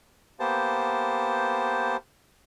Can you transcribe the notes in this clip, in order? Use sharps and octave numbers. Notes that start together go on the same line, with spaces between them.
A#3 B3 G4 C5 A5